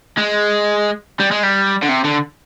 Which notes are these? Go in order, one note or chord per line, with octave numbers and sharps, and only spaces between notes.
G#3
G3
G#3
G3
D3
C3
D3